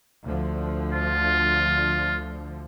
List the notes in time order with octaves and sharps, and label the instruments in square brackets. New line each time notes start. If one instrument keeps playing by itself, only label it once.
[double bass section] D2 D3 F3
[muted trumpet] F4